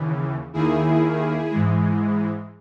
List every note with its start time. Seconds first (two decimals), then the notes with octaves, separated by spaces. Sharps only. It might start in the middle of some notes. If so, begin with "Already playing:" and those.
Already playing: D#2 C#3 E3
0.53 D#2 D#3 A#3 E4 G#4
1.51 G#2 E3 G#3